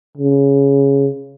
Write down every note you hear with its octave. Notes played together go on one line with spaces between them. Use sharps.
C#3